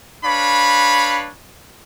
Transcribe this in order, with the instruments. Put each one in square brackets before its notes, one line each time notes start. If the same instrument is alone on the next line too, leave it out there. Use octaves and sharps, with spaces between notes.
[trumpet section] D4 B4 C#5 F5 B5